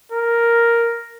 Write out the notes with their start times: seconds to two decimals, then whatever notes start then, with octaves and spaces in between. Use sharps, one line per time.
0.12 A#4